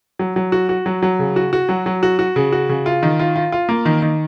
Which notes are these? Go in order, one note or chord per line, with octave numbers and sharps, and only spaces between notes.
F#3
F#3
F#4
F#4
F#3
F#3
C#3
F#4
F#4
F#3
F#3
F#4
F#4
C#3
F#4
C#3
F4
D#3
F4
F4
F4
A#3
D#3
D#3